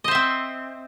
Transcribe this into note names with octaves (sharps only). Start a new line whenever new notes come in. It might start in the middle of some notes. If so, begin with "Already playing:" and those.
C4 C5 D#5 E5